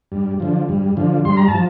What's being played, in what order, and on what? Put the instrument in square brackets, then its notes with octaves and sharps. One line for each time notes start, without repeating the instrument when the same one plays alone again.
[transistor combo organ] G2
D3 F3
G2
D3 F3
G2 C6
A#5
A5
F3